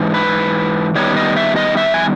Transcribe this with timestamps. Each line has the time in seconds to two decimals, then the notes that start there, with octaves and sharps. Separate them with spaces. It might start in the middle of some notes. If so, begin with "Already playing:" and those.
Already playing: G#2 E3
0.14 B4
0.95 D#3 G3 B3 C#5
1.17 D#5
1.37 E5
1.56 D#5
1.77 E5
1.94 G#5